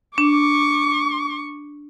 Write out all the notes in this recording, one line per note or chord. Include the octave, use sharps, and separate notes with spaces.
D4 C#6 D6